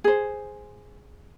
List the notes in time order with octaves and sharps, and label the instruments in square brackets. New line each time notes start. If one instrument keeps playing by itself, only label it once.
[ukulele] G#4 C5